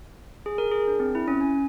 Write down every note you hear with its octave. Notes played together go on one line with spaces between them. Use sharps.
G#4
A#4
G#4
D4
C4
E4
C#4
G#5